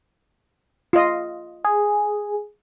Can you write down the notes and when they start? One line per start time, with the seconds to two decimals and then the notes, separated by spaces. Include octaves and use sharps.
0.93 F4 D#5
1.65 G#4